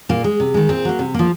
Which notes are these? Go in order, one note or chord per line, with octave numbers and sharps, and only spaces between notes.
A#2 A#3
G#3
C3
D#3 G#3
A#2 C4
F#3 A#3
C3
F3 A#3